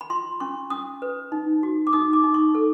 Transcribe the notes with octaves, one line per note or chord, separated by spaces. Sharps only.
B5
F4 C6
C#4 C#6
C#4 D#6
B4
D#4
F#4
D6
D#4 D#6
D6
D#4
C#6
A4